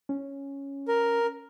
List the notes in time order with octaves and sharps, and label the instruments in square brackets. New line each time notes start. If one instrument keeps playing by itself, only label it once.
[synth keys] C#4
[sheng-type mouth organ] A#4